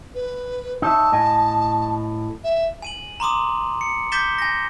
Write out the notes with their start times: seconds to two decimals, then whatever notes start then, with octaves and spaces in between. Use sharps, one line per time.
0.15 B4
0.82 D#4 C#5 E5 A5
1.12 A2 D#5 G#5
2.44 E5
2.82 G#5 D#7 F#7
3.20 A#5 C6 D6 D#6
3.81 C#7
4.12 D6 G6 A6 B6 E7 G7
4.38 G#5 A#6